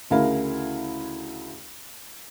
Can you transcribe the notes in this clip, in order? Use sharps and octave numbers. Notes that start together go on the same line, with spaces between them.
D2 C#3 E4 A#4 F5